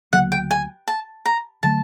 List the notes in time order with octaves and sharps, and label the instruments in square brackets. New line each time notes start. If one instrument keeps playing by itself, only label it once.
[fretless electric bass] D2 C#3 F#3 A#3 [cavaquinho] F#5
[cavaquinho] G5
G#5
A5
A#5
[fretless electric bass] D3 F#3 A3 [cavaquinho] A5